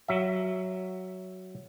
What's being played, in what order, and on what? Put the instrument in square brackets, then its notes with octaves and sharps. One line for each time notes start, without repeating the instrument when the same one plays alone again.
[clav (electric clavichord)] F#3 E5